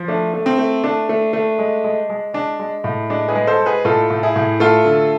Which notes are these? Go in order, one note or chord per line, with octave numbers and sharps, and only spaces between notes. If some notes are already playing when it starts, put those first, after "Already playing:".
Already playing: F3
A3 D4
A3
C4
A3
A3 D4
A3
A3
G#3
G#3
G#3
G#3 D4
G#3
A2
G#3 D4
G#4 B4
G#3
A4 C5
G#3
G#4 B4
A2 F4 A4
A2
E4 G#4
A2
A3 F4 A4
D3